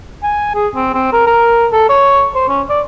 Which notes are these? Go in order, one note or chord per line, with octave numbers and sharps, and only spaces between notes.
G#5
G#4
C4
C4
A#4
A#4
A4
C#5
C5
C#4
D5